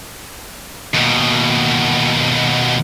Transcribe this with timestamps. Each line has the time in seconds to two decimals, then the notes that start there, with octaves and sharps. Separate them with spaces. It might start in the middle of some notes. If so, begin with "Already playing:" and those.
0.94 D#2 B2